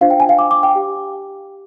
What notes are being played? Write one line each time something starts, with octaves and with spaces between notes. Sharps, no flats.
D4 F4 C5 F5
G5
G#5
F5
D6
D6
G5
G4